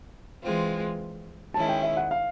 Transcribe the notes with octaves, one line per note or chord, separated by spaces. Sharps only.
E3 G#3 C4 F4
D#3 G#3 C#4 E4 A5
G5
E5
F#5
F5